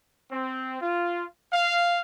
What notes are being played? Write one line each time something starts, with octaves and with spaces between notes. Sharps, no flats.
C4
F4
F5